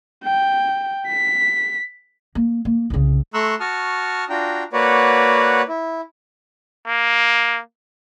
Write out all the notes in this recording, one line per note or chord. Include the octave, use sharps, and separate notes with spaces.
G5
B6
A#3
A#3
C2 C#3
A3 A#5 C6 C#6 E6 F#6
F#4 A5 C#6 D#6 F6
D4 F4 F#4 G5 A#5
A#3 F#4 B4 C#5 D5 F#5
E4
A#3